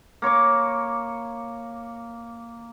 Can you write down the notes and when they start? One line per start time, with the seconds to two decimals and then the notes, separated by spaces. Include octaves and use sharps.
0.22 A#3 C#5 C#6 D6